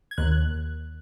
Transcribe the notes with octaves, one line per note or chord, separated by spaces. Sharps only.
G#6
D#2 F#6